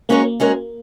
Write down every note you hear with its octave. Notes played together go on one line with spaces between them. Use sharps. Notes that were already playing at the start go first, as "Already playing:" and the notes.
G#3 A#3 C#4 F#4 A#4 C#5
G#3 C#4 F#4 A#4 C#5